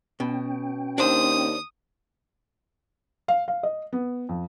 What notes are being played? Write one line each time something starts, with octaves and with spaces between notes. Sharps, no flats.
B2 C#4 G5
D#2 D4 C5 D#6
F5
F5
D#5
B3
F2